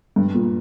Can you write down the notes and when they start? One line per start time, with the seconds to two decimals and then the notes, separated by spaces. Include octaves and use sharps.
0.16 G2
0.34 A#2